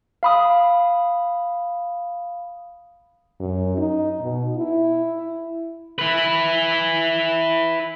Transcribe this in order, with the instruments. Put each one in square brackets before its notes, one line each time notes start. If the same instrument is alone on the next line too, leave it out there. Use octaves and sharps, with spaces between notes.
[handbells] F5 B5 D#6
[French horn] F#2
D#4
B2
E4
[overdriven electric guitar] E4 B4